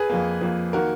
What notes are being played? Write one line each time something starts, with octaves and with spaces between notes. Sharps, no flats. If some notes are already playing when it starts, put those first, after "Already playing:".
Already playing: G#4 B4
F2 F3 A#3
F2 F3 A#3
D#3 A#3 F#4 A#4